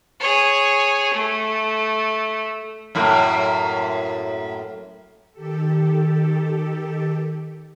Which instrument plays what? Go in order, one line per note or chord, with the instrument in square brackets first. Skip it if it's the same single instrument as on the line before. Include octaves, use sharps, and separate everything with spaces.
[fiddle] G#4 C#5
A3
[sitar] F#2 A2 A#3
[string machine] D#3 G4 A4